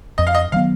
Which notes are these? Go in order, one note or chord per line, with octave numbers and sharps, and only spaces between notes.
F2 D#5
F5
D#5
D#3 F#3 B3 F5